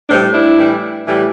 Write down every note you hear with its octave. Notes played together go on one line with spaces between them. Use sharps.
A2 E3 G3 C4 D4
D4 E4
A2 E3 G3
A2 E3 G3